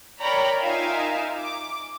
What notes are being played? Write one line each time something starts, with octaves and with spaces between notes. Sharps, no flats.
A#4 C#5 D5 G5 A#5 B5
D#4 F4 A#4 E5 F5 G#5
D6